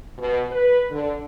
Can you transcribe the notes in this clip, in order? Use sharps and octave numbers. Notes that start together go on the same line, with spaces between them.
B2
B4
D3